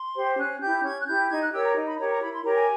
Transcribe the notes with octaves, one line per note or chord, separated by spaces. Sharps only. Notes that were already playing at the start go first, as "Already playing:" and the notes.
Already playing: C6
G4 C5
C#4 F#6
E4 G4 G6
C#4 G#6
F#6
E4 G4 G6
D#4 G#6
F#6
G4 A#4 C#5 E6
A#5
D#4
B5
G4 A#4 C#5 A#5
A#5
E4 B5
C6
G4 A#4 C#5 A#5
G#5